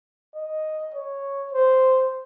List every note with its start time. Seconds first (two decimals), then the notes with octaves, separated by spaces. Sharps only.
0.35 D#5
0.94 C#5
1.53 C5